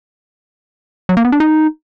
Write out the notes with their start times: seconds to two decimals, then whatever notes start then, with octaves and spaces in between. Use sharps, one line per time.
1.09 F#3
1.17 A#3
1.25 B3
1.32 D4
1.40 D#4